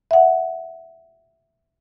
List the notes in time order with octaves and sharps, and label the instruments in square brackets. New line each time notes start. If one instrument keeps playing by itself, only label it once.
[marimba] E5 F#5